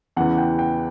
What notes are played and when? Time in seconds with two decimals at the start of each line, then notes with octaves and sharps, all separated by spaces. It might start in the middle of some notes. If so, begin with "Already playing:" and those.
0.16 E2 C#3 E3 F#5
0.38 G5
0.59 G5